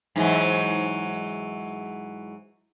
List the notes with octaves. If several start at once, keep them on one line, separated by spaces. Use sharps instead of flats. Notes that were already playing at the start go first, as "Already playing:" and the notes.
G#2 E3 F#3